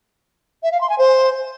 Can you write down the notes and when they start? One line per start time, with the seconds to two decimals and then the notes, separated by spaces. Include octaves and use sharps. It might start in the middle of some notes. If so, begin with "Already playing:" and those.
0.63 E5
0.72 F5
0.81 C6
0.90 G#5
0.98 C5